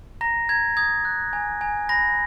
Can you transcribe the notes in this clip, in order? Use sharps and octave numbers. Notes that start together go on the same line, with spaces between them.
A#5 A#6
A#5 G#6
D#6 G#6
F#6
G#5
G#5
B5 A#6